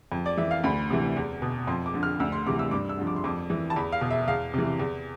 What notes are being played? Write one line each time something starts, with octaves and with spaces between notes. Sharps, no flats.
F2
D5
E3 E5
F5
D2 B5
C3 E3
E2
B2
F2 C6
D6
D3 F3
F6
D2 E6
C6
C3 E3 D6
E6
G2 D6
E6
D3 F3
D6
C6
F2 D6
E3
A5
E2 B5
F5
B2
E5
E2 F5
C3 E3
E2